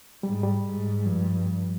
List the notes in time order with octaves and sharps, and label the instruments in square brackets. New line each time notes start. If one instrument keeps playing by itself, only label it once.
[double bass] G#2 [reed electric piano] G3
[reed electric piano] G3
[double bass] G#2
[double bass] G2 [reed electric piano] F3
[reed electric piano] G3
G3